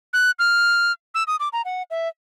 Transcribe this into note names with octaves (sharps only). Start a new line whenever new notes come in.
F#6
F6
E6
D#6
D6
A#5
F#5
E5